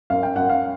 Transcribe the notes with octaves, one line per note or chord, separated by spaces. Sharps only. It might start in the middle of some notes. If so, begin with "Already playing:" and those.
F#2 F5
G5
F#2 F#5
F5